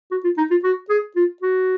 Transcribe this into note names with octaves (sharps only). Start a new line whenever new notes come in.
F#4
F4
D#4
F4
F#4
G#4
F4
F#4